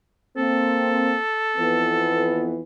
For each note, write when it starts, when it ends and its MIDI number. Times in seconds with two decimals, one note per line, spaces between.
0.37 1.15 58
0.37 1.15 60
0.37 2.51 69
1.57 2.62 41
1.57 2.62 52
1.57 2.62 59